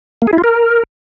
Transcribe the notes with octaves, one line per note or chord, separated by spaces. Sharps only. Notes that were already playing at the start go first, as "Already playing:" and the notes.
A#3
G#4
E4
F4
A#4